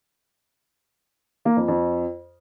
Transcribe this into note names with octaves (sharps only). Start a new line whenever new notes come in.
A#3
F2
F2